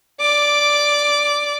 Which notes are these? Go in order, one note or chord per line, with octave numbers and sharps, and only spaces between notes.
D5 D6